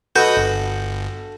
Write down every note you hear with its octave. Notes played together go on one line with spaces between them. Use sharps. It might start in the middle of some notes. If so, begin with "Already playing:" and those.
F#4 A4 B4 D#5 G6
G1